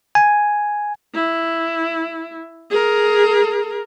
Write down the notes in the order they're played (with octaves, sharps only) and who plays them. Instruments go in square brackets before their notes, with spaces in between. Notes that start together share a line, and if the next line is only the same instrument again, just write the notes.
[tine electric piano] G#5
[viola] E4
G#4 A#4